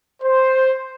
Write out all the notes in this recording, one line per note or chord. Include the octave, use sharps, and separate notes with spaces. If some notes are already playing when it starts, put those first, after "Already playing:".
C5